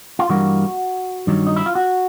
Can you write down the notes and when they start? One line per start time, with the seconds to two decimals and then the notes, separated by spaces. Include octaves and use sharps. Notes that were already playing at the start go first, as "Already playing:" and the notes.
0.19 F4
0.29 G2 E3 G3 A#3 F#4
1.27 G2 D#3 F#3
1.47 D#4
1.56 E4
1.66 F4
1.75 F#4